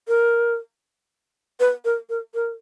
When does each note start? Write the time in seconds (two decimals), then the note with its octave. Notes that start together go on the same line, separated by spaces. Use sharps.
0.08 A#4
1.60 B4
1.85 A#4
2.10 A#4
2.35 A#4